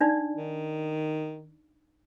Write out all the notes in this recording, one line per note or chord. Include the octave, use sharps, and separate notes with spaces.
D4 D#4 D5
D#3